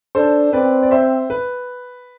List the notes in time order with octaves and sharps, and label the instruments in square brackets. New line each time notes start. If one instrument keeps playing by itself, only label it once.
[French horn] D4 [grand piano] A4 C5
[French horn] C4 [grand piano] B4 D5
[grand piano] D5
C5 E5
B4